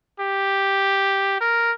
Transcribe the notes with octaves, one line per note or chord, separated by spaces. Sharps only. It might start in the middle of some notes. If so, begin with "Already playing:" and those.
G4
A#4